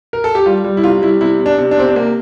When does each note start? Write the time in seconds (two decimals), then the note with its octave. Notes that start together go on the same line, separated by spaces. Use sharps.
0.13 A#4
0.24 A4
0.35 G4
0.46 G3 F4
0.64 G3
0.77 E4
0.84 C3 F4
1.02 G3 E4
1.21 C3 E4
1.40 C3
1.46 D4
1.58 C3
1.71 D4
1.78 C3 C4
1.88 D4
1.96 C3 A#3